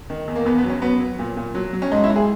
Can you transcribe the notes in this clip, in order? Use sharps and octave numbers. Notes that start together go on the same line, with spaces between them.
D#3
E2
A#3
E2 B3
B3
F#3
C#4
F#3 B3
F#3
A#2
A#2
F#3
F#3
C#4
G#2 D#4
E4
G#2
G#4